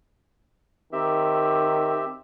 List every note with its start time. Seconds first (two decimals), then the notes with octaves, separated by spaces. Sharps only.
0.93 D#3 C4 G4 E5